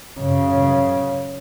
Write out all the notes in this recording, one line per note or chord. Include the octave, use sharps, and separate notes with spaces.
F#2 C#3